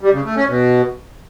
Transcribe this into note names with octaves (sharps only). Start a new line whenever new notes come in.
G3
C#3
A3
C#4
B2